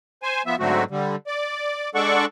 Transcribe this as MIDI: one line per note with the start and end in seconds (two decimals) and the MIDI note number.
0.23 0.42 72
0.23 0.42 80
0.46 0.56 53
0.46 0.56 59
0.46 0.56 76
0.59 0.84 44
0.59 0.84 50
0.59 0.84 54
0.59 0.84 57
0.59 0.84 60
0.59 0.84 66
0.91 1.16 50
0.91 1.16 55
1.27 1.90 74
1.95 2.26 56
1.95 2.26 62
1.95 2.26 69
1.95 2.26 74
1.95 2.26 78
1.95 2.26 85